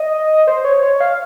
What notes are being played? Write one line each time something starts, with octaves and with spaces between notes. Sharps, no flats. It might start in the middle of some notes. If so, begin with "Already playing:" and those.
Already playing: D#5
C5
C#5
C#5
F5